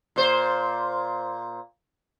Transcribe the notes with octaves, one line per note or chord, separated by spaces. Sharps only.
A#2 C5